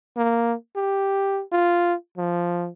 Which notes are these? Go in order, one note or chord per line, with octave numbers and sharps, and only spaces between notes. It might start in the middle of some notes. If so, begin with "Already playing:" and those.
A#3
G4
F4
F3